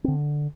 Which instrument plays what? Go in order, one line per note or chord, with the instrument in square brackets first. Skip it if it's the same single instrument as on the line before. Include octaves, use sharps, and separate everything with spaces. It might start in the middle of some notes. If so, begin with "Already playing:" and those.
[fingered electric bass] D3 C4